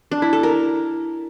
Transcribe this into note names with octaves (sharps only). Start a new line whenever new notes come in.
D4
E4
A4
A#4